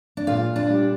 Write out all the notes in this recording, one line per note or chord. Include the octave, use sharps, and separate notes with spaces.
D4
A#2 F4
D4
G3